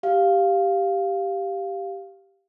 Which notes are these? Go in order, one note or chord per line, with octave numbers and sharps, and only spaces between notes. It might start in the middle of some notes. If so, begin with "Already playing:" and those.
G4 F5